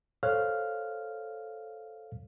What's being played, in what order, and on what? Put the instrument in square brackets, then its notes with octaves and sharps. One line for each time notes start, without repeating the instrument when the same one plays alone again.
[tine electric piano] A4 C5 C#5 F5 F6 F#6